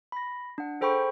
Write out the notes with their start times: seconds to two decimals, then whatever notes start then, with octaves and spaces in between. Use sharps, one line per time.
0.12 B5 A#6
0.58 D4 F#5
0.81 G#4 A4 C5 G5 B5 C#6